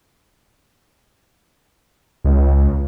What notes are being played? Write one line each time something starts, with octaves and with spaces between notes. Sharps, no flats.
C#2